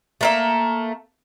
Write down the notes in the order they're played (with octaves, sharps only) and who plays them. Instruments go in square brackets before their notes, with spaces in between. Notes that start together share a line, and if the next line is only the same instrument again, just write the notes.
[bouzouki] A3 A#3 E5